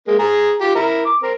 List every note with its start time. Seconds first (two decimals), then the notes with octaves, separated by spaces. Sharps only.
0.08 G#3 A#3
0.19 G#4 A#5
0.61 F4 G4
0.75 E4 A#4
1.05 D6
1.23 C4 A#4